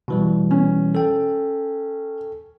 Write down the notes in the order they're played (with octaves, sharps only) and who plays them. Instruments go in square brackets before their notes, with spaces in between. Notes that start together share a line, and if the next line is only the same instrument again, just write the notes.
[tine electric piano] B2 E3 G3
[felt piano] C#4
[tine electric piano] A4 G5